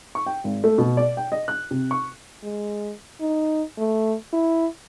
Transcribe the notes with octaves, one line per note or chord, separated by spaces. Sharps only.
C#6
G5
G#1
A3
B2
D5
G5
D#5
F#6
C3
C#6
G#3
D#4
A3
E4